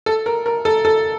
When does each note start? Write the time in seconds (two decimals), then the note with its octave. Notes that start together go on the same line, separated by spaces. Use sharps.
0.06 A4
0.26 A#4
0.46 A#4
0.65 A4
0.85 A4